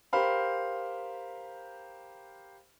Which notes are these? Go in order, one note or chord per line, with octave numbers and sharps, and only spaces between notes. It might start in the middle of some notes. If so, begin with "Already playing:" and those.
G4 A#4 C5 F5 B5